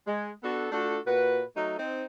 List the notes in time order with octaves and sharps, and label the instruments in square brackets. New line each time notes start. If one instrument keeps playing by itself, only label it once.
[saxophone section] G#3
B3 D4 F#4 A4
A3 D4 F4 F#4 A4
A#2 F#4 B4
F#3 A3 D#4
C4 D#4